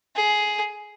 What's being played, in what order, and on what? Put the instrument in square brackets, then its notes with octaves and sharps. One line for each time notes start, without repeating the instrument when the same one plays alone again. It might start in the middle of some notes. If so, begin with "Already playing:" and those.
[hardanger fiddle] G#4